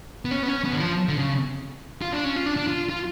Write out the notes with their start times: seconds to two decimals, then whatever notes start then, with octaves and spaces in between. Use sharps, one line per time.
0.25 B3
0.31 C#4
0.43 B3
0.48 C#4
0.64 B3
0.72 D3
0.80 F3
1.08 D3
1.17 C#3
2.02 F4
2.13 D4
2.24 C#4
2.36 F4
2.46 D4
2.56 D4
2.68 F4
2.89 F4